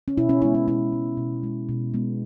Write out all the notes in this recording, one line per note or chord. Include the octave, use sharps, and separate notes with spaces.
C#4
B2 E4
C#4
G#3 B3 E4
C#4
B2 E4
G#3 B3
B2
G#3 B3
B2
G#3 B3